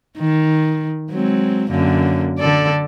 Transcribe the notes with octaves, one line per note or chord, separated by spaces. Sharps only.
D#3
F#3 G#3 C4
F#2 D3 A#3
D3 A4 D5